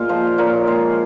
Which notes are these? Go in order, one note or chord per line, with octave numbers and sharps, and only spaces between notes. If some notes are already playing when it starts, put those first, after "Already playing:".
Already playing: A#2 G#3 F5
F3 C5 D#5
A#2 A#4 C#5
G#3 G#4 C5